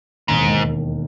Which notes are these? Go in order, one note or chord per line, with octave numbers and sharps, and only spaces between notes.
E1 D#2 G#2 D#3